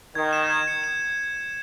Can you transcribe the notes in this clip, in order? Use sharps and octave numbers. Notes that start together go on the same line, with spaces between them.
D#3 G#6
E7
G#6
C#7
E7